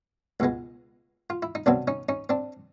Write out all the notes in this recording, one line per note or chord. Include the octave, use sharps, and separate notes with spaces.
C#2 B2 G#3 B3
F4
E4
D#4
C2 B2 F#3 B3 C4 D4
C#4 D#4
C#4 D#4
C4 D4